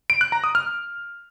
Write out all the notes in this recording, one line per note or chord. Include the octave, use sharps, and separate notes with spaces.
D7
F#6
A#5
D#6
F6